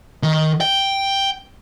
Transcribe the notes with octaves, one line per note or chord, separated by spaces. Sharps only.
D#3
G5